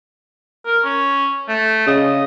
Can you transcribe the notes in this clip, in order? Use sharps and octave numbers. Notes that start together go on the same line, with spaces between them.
A#4
C#4
A3
C#3 D#5